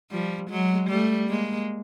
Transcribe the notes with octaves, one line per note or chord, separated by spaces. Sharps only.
F3 G3
F#3 G#3
G3 A3
G#3 A#3